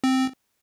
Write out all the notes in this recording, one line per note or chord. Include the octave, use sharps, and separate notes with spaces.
C4